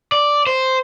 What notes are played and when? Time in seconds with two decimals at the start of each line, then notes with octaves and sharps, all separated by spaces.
0.12 D5
0.47 C5